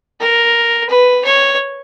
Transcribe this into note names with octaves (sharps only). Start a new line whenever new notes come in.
A#4
B4
C#5